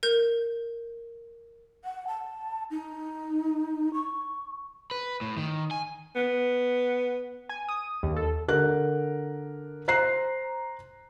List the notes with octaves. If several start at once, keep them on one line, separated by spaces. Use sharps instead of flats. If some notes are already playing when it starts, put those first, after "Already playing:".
A#4 G6
F#5
A5
D#4
C#6
B4
A2
D#3
G#5
B3
G#5
D#6
D#2
A4
D3 A#4 F#6
C5 A#5 F#6 C7